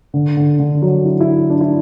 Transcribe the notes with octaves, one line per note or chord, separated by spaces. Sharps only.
D3
D3
D3
F#3
E4
E4
D4
E4